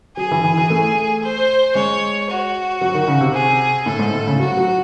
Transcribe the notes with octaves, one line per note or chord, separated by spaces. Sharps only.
F#3 G#4
E3
E3
E3
A3
C5
G#3 C#5
F#4
F#3
D#3
C#3
C3
G#4
A2 A4
G#2
A2
C#3
F#3 F#4
F#3